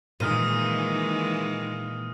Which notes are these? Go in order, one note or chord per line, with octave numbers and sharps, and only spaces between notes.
A#2 D#3 E3 G#3 D#6 F6 D#7